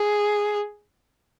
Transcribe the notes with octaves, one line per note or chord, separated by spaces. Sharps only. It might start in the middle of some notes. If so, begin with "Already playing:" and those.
Already playing: G#4